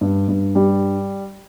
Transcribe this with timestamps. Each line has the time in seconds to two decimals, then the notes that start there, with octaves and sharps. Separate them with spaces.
0.01 G2
0.28 G2
0.55 G3